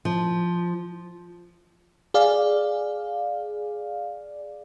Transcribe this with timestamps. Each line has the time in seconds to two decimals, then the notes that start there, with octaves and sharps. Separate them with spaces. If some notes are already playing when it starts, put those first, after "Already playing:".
0.05 F3
2.14 G#4 D5 F5